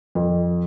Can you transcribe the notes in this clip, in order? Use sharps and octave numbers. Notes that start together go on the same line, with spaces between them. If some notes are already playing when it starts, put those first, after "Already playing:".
F2